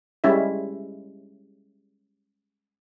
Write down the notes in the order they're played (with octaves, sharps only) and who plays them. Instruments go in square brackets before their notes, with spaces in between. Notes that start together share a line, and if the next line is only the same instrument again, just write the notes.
[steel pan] G3 G#3 C#4 E4 E5